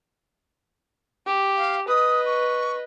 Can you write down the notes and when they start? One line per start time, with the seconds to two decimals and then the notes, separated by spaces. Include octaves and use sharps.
1.26 G4
1.56 F5
1.88 B4 D#5 D#6
2.25 C#6